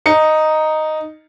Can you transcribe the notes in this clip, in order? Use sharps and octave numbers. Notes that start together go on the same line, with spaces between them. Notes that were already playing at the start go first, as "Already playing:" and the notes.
D#4 C#7